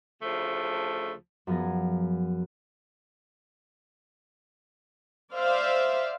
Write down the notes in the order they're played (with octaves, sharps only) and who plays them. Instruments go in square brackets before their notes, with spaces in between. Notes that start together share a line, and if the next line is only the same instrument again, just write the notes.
[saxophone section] D2 C#3 F3 A3
[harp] F#2 F3 B3 G#4 G#5 A#6
[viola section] C5 D5 E5 F5